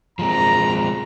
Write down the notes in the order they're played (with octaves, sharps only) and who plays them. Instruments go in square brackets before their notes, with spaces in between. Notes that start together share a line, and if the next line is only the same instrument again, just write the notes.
[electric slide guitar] F3 G#3 C4 [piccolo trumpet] A#5